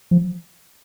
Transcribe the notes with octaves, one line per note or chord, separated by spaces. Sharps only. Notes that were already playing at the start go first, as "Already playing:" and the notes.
F3